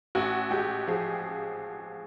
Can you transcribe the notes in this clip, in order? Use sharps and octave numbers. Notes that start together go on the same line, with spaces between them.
A1 F#4
G#3 G4
F3 G#4